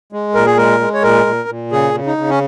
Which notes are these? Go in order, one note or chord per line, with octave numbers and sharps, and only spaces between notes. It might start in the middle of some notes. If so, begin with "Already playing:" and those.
G#3
A#2 A#4
G#4
G#3 A#4
G#3
C#5
A#2 A#4
A#2
A#2
C#3 G#4
C#3
D#4
C#3
C#4